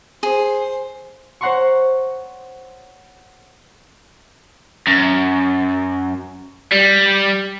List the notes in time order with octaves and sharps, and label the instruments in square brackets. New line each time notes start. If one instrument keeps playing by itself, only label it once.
[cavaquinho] G#4 [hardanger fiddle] C5
[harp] C5 C#5 F#5 A#5 C6 C#6
[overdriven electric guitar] F#2
G3